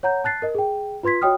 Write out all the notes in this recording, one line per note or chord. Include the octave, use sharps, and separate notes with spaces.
C#5 F#5 A#5 G6
A5 F#6 A6 C7
A#4 D#5
G#4 G5
F4 B4 C6 G#6 B6
F#4 C#5 D#5 G5 D#6 F6